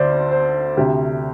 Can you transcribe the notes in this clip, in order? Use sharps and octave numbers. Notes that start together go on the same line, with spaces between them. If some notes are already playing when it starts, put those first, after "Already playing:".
Already playing: D2 D3 C5 D5
C5
D2 C3 G4